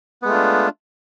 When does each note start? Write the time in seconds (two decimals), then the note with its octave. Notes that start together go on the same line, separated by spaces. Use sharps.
0.22 B3
0.25 G#3
0.28 A3
0.31 F4
0.34 D4